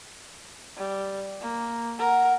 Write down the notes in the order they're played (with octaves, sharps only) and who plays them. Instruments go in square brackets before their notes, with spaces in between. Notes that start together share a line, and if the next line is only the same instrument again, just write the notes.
[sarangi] G3
A#3
[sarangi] A#4 [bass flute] F#5